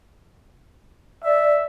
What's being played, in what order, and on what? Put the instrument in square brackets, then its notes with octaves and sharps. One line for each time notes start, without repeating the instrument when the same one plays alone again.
[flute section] D5 [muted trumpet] E5